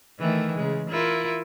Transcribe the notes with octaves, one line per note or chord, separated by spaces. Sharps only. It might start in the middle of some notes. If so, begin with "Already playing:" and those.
D#3 E3 A3
C#3 G#3
E4 F4 A#4